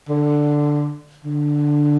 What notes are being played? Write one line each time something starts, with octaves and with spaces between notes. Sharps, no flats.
D3
D3